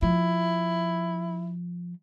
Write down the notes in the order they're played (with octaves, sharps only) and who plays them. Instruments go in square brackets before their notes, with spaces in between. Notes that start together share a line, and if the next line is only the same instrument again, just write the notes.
[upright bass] F3 [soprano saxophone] E4